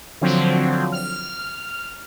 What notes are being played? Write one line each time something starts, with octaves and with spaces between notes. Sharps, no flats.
D3 F3 F#3 C4
F6